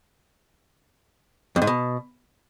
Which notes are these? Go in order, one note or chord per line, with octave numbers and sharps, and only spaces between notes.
F2
G#2
B2